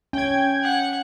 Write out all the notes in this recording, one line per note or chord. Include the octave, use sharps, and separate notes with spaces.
C#4 G5 G#6
F#5